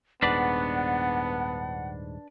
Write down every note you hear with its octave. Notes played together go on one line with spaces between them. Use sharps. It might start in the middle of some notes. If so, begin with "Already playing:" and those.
D#1 G#2 B3 D4 B4 D5 F#5